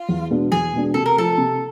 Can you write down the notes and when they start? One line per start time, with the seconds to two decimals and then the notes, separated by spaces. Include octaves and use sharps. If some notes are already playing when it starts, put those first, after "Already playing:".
Already playing: F4
0.09 E2
0.30 B2 G#3 B3 D4
0.52 E2 G#4
0.73 B2 G#3 B3 D4
0.94 C3 A4
1.06 A#4
1.16 F3 A3 A4
1.38 C3